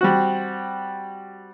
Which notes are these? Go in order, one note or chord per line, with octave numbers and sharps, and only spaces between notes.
G3 C4 F#4